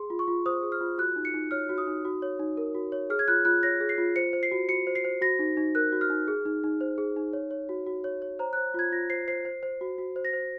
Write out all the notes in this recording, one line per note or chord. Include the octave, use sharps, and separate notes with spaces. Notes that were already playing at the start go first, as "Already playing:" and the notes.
Already playing: G#4 C6
F4
C#6
F4
C5 D#6
G#4
F6
F4
F#4 F#6
D#4
C#7
D#4
C#5 F6
F#4
D#6
D#4
F#4
C#5
D#4
A#4
F#4
C#5
G#4 F6
G#6
F4 F#6
F4 F#6
C#5 A#6
G#4
C7
F4
C5 C#7
C5
C7
F#4
F#4 C#7
C5
C7
C5
F#4 A#6
D#4
D#4
A#4 F#6
F#4
F6
D#4
G#4
D#4
D#4
C5
G#4
D#4
C#5
C#5
F#4
F#4
C#5
C#5
C5 A#5
C5 F#6
F4 G#6
F4 A#6
C5 C7
C5 C7
C5
C5
F#4
F#4
C5
A#6
C5